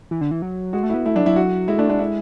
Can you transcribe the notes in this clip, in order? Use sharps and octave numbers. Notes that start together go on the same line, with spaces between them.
E3
D3
E3
F#3
G#3 F#4
A3
B3 E4
A3 E4
F#3 D4
F#3 E4
F#4
G#3 E4
A3 D4
G#3 D4
E4